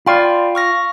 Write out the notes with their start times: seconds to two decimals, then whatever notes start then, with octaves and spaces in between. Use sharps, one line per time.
0.06 F4 D5 G5 B5
0.55 C#6 F6 A#6